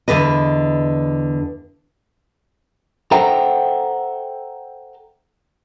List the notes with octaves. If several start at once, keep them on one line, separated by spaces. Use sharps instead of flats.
E2 B2 D3 B4 D#5
A4 C5 E5 F#5 G5 A#5